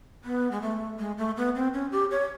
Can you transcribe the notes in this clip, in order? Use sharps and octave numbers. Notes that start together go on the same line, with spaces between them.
B3
G#3
A3
G#3
A3
B3
C4
C#4
G4
C#5